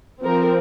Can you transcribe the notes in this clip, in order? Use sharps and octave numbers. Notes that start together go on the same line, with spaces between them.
F3 C4 A#4